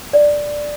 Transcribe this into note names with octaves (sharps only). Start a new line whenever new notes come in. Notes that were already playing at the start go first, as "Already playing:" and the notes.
D5